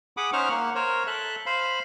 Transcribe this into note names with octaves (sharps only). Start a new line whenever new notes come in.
G#4 F#5 B5 D6 D#6
C#4 D#4 C5 F#5 C#6 F6
A#3 F#5
A#4 C5 C#5
A4 E5 F#6
C5 F5 B5